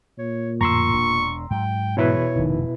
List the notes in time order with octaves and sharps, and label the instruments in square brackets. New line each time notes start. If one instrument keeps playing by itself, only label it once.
[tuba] A#2 [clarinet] C#5
[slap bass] F2 A2 D3 [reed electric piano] A#5 C6 E6 [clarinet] C#6
[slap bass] E1 D4
[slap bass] G#2 F#3 [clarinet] G5
[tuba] E2 [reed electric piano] B2 E4 B4 [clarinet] C#5
[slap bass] F1 A2 [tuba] D#3